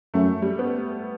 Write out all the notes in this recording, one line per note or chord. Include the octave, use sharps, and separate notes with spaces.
F#2 A3
G3
B3